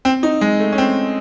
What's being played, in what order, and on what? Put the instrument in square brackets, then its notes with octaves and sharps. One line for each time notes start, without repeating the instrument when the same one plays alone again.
[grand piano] C4
D#4
G#3
A3
C#4
C4